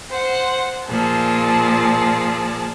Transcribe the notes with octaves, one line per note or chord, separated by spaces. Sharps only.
C5 F#5
A#2 F3 G#4 A5